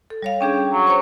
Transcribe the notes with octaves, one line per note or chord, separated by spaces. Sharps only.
A4
G3 C#5 F5
C#4 D4 G#4 G5
F#3
C5 C#5